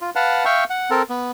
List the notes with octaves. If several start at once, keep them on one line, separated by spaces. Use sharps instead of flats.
F4
B4 F5 F#5 A5
E5 F5 G5 C#6
F#5
C4 A4 A#4
B3